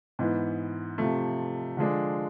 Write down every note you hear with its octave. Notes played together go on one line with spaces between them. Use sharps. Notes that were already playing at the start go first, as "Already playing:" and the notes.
G#2 E3 B3
C3 F3 A3
D3 F3 G#3 D4